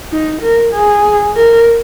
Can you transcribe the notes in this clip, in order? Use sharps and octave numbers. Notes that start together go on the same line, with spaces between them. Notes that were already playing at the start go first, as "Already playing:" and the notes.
D#4
A#4
G#4
A#4